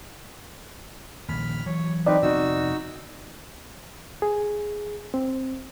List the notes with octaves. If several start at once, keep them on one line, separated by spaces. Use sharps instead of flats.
A#1 D#2 B5 F6
E3 F#3 C#5
C4 D#4 B4 D5
F1 B3 C4 D#4 F#4 E6
G#4
C4